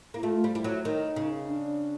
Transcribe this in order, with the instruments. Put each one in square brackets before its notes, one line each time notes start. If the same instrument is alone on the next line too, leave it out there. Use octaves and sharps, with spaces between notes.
[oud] A#3 [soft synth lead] E4
[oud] A3 [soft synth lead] F4
[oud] G3
[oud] G3 [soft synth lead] E4
[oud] F#3
[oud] D#3 [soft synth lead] D#4
[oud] C#3
[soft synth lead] D4